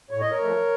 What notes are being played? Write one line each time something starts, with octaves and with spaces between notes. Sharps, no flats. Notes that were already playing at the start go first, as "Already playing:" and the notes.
A2 C#5
D#5
A#4 C#5
F3 A3